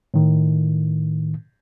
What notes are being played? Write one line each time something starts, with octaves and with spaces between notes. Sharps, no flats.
A2 D#3